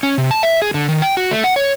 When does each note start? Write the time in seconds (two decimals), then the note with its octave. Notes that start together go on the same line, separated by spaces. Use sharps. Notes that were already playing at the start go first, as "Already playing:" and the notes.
0.03 C#4
0.18 C3
0.31 A5
0.43 E5
0.62 G#4
0.74 D3
0.89 D#3
1.02 G5
1.17 F#4
1.31 A3
1.44 F#5
1.56 C#5